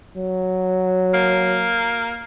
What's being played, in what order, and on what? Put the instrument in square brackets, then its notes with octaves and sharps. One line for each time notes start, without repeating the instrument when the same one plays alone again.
[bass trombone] F#3
[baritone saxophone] A#3